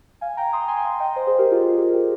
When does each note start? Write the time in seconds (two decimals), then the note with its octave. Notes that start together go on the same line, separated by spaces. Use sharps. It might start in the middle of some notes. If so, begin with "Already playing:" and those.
0.21 F5 G#5
0.37 G5 A#5
0.53 C6 D#6
0.68 G#5 C6
0.84 F5 G#5
1.00 D#5 G5
1.16 C5 D#5
1.27 G#4 C5
1.39 G4 A#4
1.51 F4 G#4
1.63 F4 G#4
1.78 G4
1.94 G4